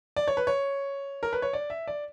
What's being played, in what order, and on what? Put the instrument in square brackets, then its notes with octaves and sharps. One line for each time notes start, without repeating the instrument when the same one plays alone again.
[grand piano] D5
C#5
B4
C#5
A#4
B4
C#5
D5
E5
D5